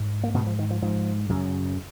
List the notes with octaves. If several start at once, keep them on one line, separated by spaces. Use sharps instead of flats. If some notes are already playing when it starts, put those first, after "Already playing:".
Already playing: G#2
A#3
G#2 B2 B3
F3
D#3
F3
G#2 F3
F#2 C#3